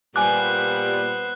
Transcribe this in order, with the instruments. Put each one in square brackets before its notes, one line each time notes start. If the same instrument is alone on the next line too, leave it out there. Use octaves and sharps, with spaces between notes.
[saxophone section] A#2 G3 [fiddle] B3 C5 [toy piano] G#5 D6 [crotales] F#6